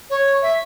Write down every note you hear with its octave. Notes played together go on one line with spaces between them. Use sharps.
C#5
E5